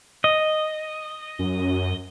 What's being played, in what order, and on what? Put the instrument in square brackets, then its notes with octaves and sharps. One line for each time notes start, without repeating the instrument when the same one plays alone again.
[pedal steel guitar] D#5
[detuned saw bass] F#2